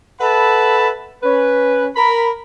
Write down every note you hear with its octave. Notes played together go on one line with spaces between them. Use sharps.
A4 B4 E5 F#5 A5 B5
C#4 B4
A#4 B5